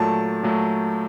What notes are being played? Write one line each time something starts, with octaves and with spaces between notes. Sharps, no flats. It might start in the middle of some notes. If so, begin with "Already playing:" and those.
Already playing: A#2 F#3 A3 A5
A#2 F#3 A3